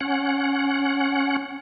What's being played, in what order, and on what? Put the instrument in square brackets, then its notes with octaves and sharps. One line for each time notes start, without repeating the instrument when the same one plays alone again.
[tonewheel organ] C#4 F#5